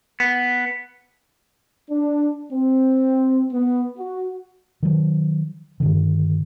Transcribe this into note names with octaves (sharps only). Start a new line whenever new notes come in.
B3
D4
C4
B3
F#4
D#3 F#3
G2 D3 D#3